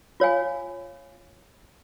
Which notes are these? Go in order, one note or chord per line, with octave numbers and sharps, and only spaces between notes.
F4 C#5 F5 G#5